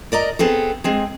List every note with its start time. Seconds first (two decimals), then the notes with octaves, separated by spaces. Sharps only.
0.12 A#4 D5 D#5 A#5
0.39 B3 C4 G#4 A4
0.84 G#3 C4 G#4